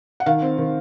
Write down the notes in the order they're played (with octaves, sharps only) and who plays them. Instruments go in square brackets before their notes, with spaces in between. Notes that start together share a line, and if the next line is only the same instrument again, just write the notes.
[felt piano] F#5
D#3 F5
C4
D#3